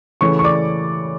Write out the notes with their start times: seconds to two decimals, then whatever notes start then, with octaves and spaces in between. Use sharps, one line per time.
0.21 C#3 E3 A3 C#5 C#6
0.39 C#6
0.44 D5 D6